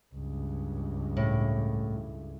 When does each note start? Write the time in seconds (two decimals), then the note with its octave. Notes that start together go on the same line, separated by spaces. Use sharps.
0.13 C#2 G2
1.17 A2